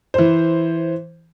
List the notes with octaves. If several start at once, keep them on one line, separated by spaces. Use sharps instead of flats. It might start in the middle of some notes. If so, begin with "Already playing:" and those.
E3 C5